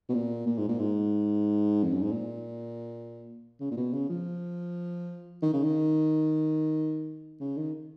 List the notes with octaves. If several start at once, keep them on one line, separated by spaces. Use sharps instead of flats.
B2
A#2
A#2
G#2
A#2
G#2
F2
F#2
G#2
A#2
C#3
A#2
B2
C#3
F3
D#3
C#3
D#3
C#3
D#3